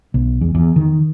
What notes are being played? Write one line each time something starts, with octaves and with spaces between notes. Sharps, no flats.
B1
E2
E2
D#3